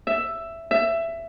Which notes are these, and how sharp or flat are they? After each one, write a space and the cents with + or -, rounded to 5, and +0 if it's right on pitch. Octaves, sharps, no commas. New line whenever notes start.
E5 +10
E5 +15